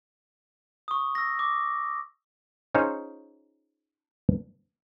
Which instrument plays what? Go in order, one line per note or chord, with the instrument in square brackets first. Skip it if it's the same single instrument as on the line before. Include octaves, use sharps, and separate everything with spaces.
[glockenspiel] C#6 D#6
E6 A#6
D6
[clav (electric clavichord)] C#4 D#4 F4 G#4 C5 C#5